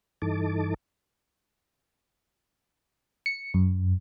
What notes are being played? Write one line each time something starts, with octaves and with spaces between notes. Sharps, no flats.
G2 E3 D#4 A4 A5 D6
C#7
F#2